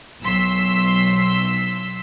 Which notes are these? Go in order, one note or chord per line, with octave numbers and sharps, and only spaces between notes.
B1 C6 E6 B6